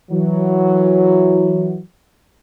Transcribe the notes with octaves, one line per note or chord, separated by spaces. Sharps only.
E3 F#3